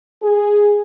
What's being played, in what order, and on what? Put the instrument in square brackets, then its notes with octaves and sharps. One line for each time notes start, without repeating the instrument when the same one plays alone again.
[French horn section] G#4